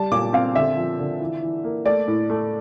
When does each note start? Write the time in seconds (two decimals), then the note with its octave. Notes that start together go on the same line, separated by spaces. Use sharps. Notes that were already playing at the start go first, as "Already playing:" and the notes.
Already playing: G3 A5
0.12 A#2 D6
0.33 C4 F5
0.55 D3 E5
0.77 F3
0.99 D3
1.20 E3
1.42 E3
1.64 A#3
1.85 A3 D5
2.08 A2
2.30 A3